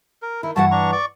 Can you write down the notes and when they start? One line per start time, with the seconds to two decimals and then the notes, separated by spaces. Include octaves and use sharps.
0.22 A#4
0.43 D#3 E4
0.56 G2 E3 F#4 F#5 A5
0.71 D4 A#5 C#6
0.92 D5 C#6 D6